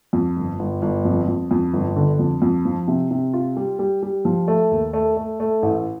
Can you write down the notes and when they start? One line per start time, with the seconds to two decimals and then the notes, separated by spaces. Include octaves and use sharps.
0.13 F2
0.36 G1
0.59 G1
0.82 G1
1.05 F2
1.28 F2
1.51 F2
1.73 G1
1.96 D3
2.19 F2
2.42 F2
2.65 F3
2.88 C3
3.11 C3
3.33 F4
3.57 G3
3.79 G3
4.02 G3
4.25 F3
4.48 A3
4.71 D#2
4.93 A3
5.17 A3
5.40 A3
5.63 A1